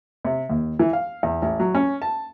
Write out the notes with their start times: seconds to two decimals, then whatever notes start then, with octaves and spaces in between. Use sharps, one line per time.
0.25 C3
0.50 D#2
0.79 E3
0.93 F5
1.23 E2
1.42 A1
1.60 F#3
1.75 C#4
2.02 A5